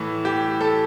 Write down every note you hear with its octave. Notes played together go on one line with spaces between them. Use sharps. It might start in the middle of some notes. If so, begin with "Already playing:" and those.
Already playing: A2 E3
G4
A4